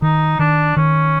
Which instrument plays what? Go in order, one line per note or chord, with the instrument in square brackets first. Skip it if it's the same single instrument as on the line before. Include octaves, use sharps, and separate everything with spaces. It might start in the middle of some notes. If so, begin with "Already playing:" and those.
[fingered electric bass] D#3 [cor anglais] D#4
[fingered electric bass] D#3 [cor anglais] D4
[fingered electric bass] D#3 [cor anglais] C#4